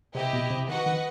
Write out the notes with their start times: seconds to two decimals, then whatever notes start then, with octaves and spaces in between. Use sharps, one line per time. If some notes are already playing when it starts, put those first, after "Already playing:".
0.14 C3 E4 G4 D#5
0.33 B2
0.51 C3
0.68 D#3 F#4 B4 D#5 F#5
0.86 D#3